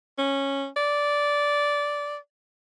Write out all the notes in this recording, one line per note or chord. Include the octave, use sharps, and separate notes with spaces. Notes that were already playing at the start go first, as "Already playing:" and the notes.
C#4
D5